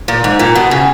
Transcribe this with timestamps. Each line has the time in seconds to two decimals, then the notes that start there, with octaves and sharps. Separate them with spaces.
0.08 A#2
0.24 G#2
0.39 A#2
0.55 B2
0.71 C#3